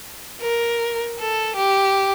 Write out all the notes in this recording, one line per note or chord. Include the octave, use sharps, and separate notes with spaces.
A#4
A4
G4